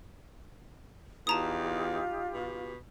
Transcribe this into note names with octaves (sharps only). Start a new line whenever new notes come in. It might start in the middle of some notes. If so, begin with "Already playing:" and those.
E2 D#4 F4 G4 A5 A#5 D#6
B2